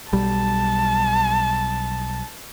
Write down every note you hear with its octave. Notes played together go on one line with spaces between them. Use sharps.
B1 G3 A5